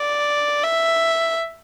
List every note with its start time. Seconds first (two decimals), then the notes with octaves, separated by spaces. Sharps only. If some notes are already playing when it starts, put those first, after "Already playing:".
Already playing: D5
0.64 E5